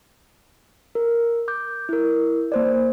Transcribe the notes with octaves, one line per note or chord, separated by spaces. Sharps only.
A#4
D6 G6
E4 A#4
A#3 C5 D5